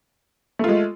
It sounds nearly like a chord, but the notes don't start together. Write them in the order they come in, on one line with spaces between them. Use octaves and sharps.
A3 F4 G#3